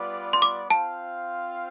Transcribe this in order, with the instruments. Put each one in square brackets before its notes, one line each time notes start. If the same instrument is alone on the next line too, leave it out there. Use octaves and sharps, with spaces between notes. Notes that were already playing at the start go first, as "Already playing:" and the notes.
Already playing: [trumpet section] G3 B3 F4 B4 D5
[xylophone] C6
D6
[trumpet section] C4 F4 C5 F5 [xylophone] A5